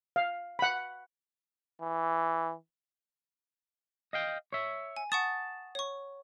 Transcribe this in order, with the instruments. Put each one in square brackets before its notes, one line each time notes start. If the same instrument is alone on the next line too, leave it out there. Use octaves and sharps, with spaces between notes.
[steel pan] F5
F#5 B5
[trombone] E3
[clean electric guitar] D#5 F5 G5
C#5 E5
[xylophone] G#5
[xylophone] F#5 C#6 D#6 [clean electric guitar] A5
[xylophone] C#5 C#6